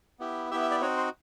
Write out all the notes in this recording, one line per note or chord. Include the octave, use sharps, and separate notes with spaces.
B3 E4 G4
B3 E4 G4 E5
E5
D5
C4 D#4 F#4 C#5
C5